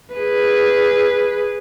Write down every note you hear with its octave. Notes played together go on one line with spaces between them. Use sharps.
G#4 B4